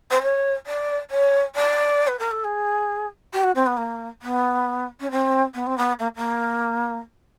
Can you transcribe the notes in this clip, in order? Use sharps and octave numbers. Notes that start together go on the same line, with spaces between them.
C5
C#5
D5
C#5
D5
B4
A#4
A4
G#4
G4
F#4
C4
B3
A#3
B3
C#4
C4
B3
C4
B3
A#3
A#3